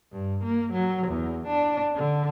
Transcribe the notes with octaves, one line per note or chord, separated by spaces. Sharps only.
G2
A#3
F#3
E2
D4
D3